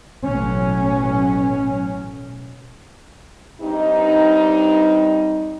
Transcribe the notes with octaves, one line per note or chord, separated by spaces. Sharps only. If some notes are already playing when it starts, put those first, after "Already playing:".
A1 B2 F#3 C#4
G2 G3 C4 D#4